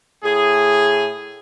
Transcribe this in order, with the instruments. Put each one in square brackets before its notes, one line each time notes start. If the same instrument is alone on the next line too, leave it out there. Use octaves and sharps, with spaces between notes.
[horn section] A2 G#4